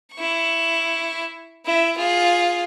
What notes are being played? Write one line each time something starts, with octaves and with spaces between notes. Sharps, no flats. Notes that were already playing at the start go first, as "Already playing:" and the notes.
E4 C#6
E4 E5
F4 G#4